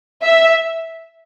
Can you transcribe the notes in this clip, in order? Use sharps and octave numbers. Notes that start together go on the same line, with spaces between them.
E5